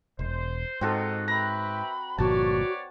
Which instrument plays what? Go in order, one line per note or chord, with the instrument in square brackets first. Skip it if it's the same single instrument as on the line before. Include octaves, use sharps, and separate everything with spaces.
[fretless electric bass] E1 [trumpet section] C5
[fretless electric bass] G#2 [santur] C4 F#4 A4 [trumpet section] D#4 F4
[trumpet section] B4 E5 G5 [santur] A#5 [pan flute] B5
[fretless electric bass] G1 A#2 F3 [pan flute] F#4 [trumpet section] B4 C#5 D5 [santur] A5